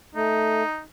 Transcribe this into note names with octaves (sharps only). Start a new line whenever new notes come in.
A3 D#4